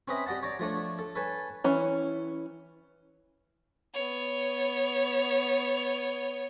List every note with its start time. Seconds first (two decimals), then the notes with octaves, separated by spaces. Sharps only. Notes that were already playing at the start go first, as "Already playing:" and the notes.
0.08 C4 C#4 B4 D#5 E5 B5
0.26 G4 D5 D#5 F#5 A5
0.43 C#5 D5 A#5 D6
0.59 F3 A3 D4 C#5
0.99 A4
1.15 A4 B4 C#5 G#5 A5
1.64 E3 C#4
3.94 B3 C#5